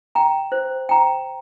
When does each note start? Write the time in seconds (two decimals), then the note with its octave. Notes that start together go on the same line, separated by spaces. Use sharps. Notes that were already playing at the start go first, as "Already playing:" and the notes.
0.15 G5 A#5
0.52 C5
0.89 G5 A#5